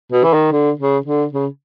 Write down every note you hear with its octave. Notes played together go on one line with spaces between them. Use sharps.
B2
E3
D#3
D3
C#3
D3
C#3